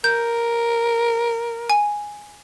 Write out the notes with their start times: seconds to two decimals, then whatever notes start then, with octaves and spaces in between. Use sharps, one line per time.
0.04 A#4 G6
1.70 G#5